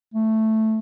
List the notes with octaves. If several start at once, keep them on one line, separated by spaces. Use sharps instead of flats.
A3